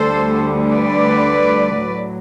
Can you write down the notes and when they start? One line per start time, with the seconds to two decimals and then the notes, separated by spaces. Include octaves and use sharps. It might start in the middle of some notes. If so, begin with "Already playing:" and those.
Already playing: D2 D3 G3 A4 C5
0.72 B4 D5
1.85 A2 F#3